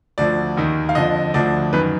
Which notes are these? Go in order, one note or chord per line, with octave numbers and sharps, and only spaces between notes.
D2 D3 F3 D5
D#2 D#3
F5
F2 D3 F3 D#5
D2 D3 F3 D5
F#2 D#3 B4